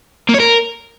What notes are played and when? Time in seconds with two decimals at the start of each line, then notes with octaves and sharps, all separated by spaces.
0.29 A#3
0.35 C#5
0.40 A#4